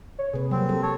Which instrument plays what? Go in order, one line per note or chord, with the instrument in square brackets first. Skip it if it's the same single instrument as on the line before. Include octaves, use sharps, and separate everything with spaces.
[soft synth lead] C#5
[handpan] C3 A#3 B4 [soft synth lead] G#4
[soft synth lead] F#3 [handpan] G3 A#3 A#4 [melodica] C4
[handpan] A4
[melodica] C#5 [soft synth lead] A5